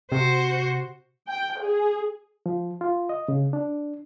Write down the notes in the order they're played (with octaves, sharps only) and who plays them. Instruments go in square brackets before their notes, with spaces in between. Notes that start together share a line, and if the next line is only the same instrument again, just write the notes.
[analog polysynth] C3 [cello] F#4 C5
[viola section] G5
G#4
[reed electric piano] F3
F4
D#5
C#3
D4